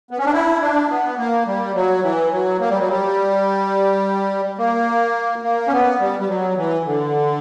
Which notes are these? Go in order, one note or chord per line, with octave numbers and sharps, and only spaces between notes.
B3
C#4
D4
E4
D4
B3
A#3
G3
F#3
E3
F#3
A#3
G3
F#3
G3
A#3
A#3
C#4
B3
G3
G3
F#3
E3
D3